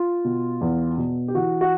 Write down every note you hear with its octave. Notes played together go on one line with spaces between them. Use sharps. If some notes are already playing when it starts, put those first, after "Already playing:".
Already playing: F4
B2
E2
B2
G4
E3 F#4
F#4